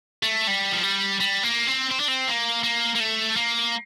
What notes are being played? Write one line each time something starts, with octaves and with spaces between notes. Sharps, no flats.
A3
G3
F3
G3
G3
A#3
C4
C4
D4
C4
A#3
A#3
A#3
A3
A#3